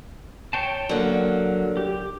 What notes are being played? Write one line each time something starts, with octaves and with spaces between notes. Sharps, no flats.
C#5 G5 A5
D3 F#3 A#3
G4